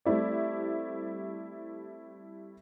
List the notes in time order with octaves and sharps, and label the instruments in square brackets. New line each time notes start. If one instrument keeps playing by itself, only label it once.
[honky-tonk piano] G3 A3 C4 E4 D5